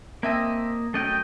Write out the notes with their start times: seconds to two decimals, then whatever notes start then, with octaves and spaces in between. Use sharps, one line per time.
0.23 A#3 C4 D#5 E5 A5
0.94 F#2 A3 D#5 G5